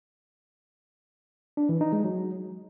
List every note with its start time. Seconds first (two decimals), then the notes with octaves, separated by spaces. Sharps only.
1.57 D4
1.69 E3
1.81 D#4
1.93 G#3
2.04 F#3